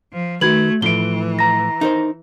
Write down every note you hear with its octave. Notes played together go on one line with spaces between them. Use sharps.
F3
D#3 A3 F#4 B4 G#6 F#7
A2 E3 F3 D7 G7
A#5 A#6
D#4 A#4 C5